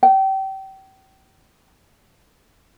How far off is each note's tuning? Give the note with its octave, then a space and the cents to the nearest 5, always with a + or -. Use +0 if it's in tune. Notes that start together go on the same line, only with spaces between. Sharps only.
G5 -30